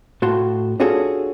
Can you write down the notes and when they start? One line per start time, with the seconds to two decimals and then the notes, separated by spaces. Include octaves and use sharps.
0.22 A2 F#4 F5 A5 C6
0.80 D4 F4 F#4 G#4 A4 C#5